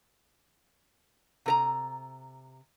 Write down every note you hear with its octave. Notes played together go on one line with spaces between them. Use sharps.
C3 A#4 A#5